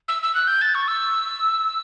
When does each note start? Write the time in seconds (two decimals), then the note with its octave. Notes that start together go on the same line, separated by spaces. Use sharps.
0.08 E6
0.23 E6
0.35 F#6
0.47 G6
0.61 A6
0.74 C#6
0.88 E6